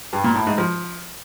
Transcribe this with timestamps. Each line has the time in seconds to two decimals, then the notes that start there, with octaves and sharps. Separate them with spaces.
0.13 G2
0.24 A#2
0.35 A2
0.47 G#2
0.58 F3